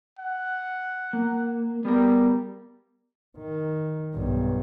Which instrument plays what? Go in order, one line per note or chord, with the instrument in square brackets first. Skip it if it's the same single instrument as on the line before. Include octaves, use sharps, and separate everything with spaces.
[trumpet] F#5
[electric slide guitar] A#3
[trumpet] G3 [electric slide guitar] B3 G#4 A#4
[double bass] D#3
B1 G2